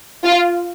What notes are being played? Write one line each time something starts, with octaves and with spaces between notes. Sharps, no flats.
F4